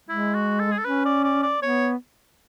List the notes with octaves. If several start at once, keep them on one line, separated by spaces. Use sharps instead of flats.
G#3 E4
F#4
A4
G#4
A4
C#4 B4
D5
D5
D5
B3 C#5